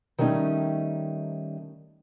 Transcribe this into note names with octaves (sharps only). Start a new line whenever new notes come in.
D#3 G3 A3 C#4 D#4